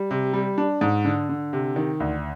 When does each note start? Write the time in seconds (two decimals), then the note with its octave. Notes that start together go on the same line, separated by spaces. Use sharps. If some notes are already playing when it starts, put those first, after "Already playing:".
Already playing: G3
0.11 C3
0.33 G3
0.58 D4
0.81 G#2
1.05 D3
1.29 D3
1.53 C3
1.76 D#3
2.00 D2